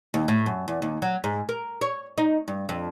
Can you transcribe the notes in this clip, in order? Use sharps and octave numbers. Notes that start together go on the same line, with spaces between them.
D#2
A2
F#2
E2
D#2
F#3
G#2
A#4
C#5
D#4
G2
F2